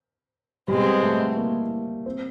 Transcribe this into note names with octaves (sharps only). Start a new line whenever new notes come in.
B2 G3 G#3 C4
A3
A#3
C4